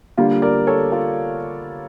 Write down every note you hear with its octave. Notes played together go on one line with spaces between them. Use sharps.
D3 G3 A#3 F4
A#4 D5
A4 C#5
F4 A4